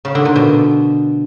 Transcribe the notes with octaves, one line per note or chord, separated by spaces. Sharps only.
C#3
D3
A#2
B2